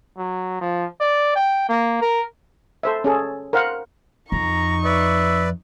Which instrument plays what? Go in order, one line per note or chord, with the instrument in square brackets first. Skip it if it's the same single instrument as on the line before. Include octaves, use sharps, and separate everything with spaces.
[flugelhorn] F#3
F3
D5
G5
A#3
A#4
[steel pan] A4 C5 E5
C#4 G#4 A4
A#4 C5 F5 F#5
[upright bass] F2 [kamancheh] D#4 C#6 [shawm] A#5
[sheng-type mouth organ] B4 D5 [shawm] E5